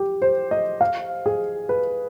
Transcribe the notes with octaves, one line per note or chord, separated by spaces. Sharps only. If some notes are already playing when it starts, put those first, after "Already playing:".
Already playing: G4
C5
D#5
F5
G#4
B4